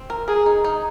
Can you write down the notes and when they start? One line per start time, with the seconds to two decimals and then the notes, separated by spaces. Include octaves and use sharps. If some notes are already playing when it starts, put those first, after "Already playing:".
Already playing: C4
0.10 A#4
0.28 G#4 A#4
0.46 D#4
0.64 D#4